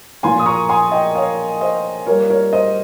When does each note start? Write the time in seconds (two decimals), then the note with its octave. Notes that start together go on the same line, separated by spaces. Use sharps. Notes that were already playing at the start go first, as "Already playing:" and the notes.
0.23 A#2 F3 A#3 F4 G#5 C6
0.39 D#6
0.46 A#5 C#6
0.69 G#5 C6
0.92 D#5 G5
1.15 C#5 F5
1.61 C5 D#5
2.07 G3 A#3 F4 A#4 C#5
2.30 A#4 C#5
2.53 C5 D#5